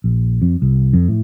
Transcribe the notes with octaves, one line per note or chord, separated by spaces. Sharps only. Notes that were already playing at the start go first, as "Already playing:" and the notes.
A#1
F2
C2
F2
A2